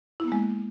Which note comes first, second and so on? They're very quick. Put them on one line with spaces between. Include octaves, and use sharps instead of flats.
E4 B3 A#3 G#3